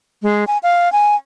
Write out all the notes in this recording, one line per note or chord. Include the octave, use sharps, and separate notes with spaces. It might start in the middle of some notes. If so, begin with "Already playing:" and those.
G#3
G#5
F5
G#5